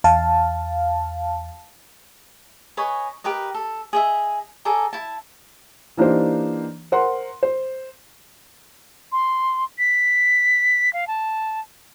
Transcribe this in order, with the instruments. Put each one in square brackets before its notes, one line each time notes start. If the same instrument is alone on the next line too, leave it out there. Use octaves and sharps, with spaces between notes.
[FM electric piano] E2 F5 A5
[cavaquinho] B4 C#5 D#5 G#5
G4 A#4 B4 D#5
A4
G#4 D#5 E5
G#4 A4 D5 A#5
E4 A5
[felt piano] E3 A#3 D4 D#4 G4 C5
A#4 C5 F#5 C6
C5
[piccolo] C6
B6
F5
A5